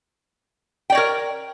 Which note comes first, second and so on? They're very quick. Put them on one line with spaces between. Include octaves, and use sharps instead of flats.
G5 D5 C#5 A#4